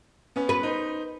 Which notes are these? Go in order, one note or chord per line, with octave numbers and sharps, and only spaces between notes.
B3 C#4
B4
D#4 C5